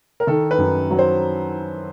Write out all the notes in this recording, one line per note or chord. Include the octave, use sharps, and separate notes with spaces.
A#4
D#3 A4
B4
F#2
F#3
C5